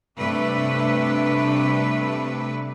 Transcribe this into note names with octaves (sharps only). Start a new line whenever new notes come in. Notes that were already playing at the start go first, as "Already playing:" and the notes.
G2 C3 A3 D4 B4